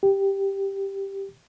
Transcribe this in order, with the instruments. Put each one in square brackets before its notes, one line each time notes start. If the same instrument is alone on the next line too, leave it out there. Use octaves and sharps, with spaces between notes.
[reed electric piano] G4